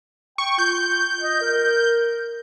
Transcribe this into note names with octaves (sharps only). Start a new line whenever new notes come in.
G5 C#6
F4 G6
D#5
A#4